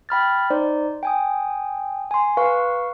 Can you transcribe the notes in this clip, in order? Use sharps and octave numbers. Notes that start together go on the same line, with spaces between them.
G5 B5 F6 A6
D#4 C5 D5
G5 G#5 D#6
G#5 C6
B4 F5 C#6